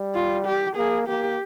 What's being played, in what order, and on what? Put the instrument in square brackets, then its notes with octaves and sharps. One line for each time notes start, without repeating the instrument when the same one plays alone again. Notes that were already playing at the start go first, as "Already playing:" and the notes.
Already playing: [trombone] G3
[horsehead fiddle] F4
G4
[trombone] A#3 [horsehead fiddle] G#4
[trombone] A#3 [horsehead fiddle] G4